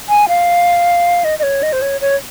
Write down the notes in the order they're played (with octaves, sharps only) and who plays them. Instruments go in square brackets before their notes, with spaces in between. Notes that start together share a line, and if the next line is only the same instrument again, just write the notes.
[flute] G#5
F5
D#5
D#5
C#5
D#5
C5
C#5
C#5